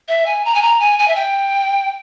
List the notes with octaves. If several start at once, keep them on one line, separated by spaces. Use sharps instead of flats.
E5
G#5
A#5
G#5
A#5
G#5
G#5
E5
G5